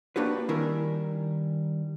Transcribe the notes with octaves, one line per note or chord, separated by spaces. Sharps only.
A#3 D4 F#4 G4 B4
D#3 G3 C#4 E4 A#4